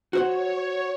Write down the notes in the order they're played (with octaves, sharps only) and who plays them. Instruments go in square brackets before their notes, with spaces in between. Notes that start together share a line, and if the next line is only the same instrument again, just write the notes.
[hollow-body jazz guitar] F#4 C5 F#5 [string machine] C#5